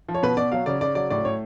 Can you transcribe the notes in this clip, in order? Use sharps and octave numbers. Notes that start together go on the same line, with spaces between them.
F3
C#5
B2 B4
B2 D5
F#3 F5
C#3 D5
C#3 D5
F#3 D5
A2 D5
A2 C#5